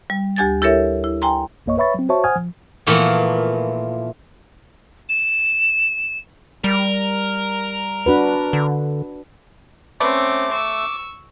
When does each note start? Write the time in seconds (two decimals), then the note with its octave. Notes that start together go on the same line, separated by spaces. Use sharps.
0.10 G3
0.36 D2 G4 G#5 G#6 A6
0.62 E4 G4 A4 A#4 C#5 E5
1.04 E4
1.22 G5 G#5 A#5 C6
1.66 A#1 F#2 A#3 C#5 D#5 C#6
1.77 B4 C#5 E5 B5 C#6 A6
1.94 F#3 C4
2.09 F#4 C5 C#5 E5 A5 C#6
2.24 C5 F#5 G#5 D#6 F6 G#6
2.36 F3
2.87 A#2 E3 F3 A3 B3
5.09 E7
6.64 G3 A#4
8.06 D4 F#4 B4
8.53 D3
10.00 A3 C4 C#4 B4 D5 D6
10.51 C#6 E6